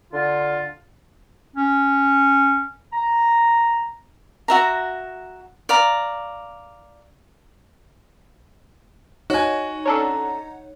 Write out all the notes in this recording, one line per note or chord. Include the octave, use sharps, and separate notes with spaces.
D3 F4
C#4
A#5
F#4 E5 A#5
D5 F5 A#5
D#4 F#4 C#5 F#5 G#5
C#4 D4 A4 A#5